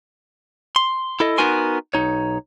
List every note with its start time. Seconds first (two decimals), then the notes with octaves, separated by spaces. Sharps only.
0.76 C6
1.20 E4 A4 D#5
1.38 B3 D#4 F#4 A#4 G#5 C6
1.94 B1 D#4 C#5